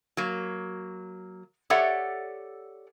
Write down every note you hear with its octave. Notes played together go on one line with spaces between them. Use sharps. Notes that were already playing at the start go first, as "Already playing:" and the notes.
F#3 A#3
G4 A4 C#5 D5 E5 F#5